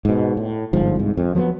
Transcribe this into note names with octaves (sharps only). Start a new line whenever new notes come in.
G#2 B2
A2
G1 G#2 F3
C2 G#2
F2
F3 F#3 A#3 B3